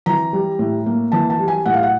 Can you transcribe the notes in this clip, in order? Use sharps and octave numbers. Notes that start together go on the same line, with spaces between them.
E3 A#5
G3
A2
A#3
E3 A5
A5
G3
G#5
A2 F#5
F5
F#5